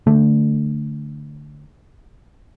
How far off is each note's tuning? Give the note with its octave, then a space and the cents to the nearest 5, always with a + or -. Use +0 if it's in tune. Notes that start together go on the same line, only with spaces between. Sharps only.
D3 +0 A3 +10